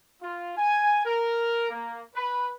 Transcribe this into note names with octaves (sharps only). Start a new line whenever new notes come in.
F4
G#5
A#4
A#3
B4